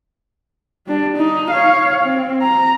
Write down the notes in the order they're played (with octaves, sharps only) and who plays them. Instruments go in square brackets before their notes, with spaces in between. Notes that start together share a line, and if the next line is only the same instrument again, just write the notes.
[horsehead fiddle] G3 D4
D#4
C#5 F5
C4
A#5